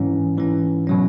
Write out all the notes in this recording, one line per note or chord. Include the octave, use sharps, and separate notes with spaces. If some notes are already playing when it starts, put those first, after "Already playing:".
Already playing: G#2 E3 C#4
G#2 E3 C#4
B2 F#3 C#4